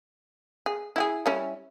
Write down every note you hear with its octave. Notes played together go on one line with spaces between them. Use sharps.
G#4
E4 G4 G#4
G3 C#4 E4